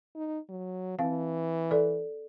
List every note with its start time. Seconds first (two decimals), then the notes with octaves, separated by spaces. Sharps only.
0.15 D#4
0.49 F#3
0.99 E3 C4 F5
1.71 A4 D5